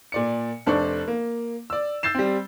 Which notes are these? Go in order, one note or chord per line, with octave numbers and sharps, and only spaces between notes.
A#2 D5 C#7
F1 D4 A4 C5 D5 C#6
A#3
D5 E6
E6 G6 A6 C7 E7
G3 C4